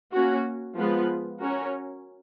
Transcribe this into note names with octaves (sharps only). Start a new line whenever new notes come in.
A#3 C#4 F#4
F3 G#3 B3 F4 B4
C#4 F#4 A#4 C#5